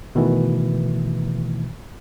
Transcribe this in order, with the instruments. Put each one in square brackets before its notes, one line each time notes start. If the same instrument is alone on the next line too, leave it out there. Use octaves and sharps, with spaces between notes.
[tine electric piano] B2 D#3 E3 A3